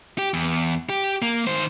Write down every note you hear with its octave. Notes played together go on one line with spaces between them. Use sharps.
G4
E2
G4
A#3
D#3 C5